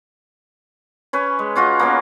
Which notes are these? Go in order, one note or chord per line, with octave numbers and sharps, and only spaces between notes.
C#4 B4 C#5
G#3
C#4 F4 F#4 D#5
A#3 B3 C#4